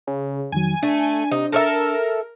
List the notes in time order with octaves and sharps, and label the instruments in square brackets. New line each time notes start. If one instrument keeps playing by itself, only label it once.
[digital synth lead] C#3
[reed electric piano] F2 D#3 F#3 [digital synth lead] G#5
[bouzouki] A3 [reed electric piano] D4
[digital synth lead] C3 [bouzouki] D#4
[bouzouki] A4 C#5 E5 [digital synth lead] A#4